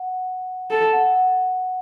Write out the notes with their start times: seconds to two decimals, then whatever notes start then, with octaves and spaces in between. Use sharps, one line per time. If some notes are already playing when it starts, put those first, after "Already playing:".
Already playing: F#5
0.71 A4 A5
0.93 F#5
1.16 F#5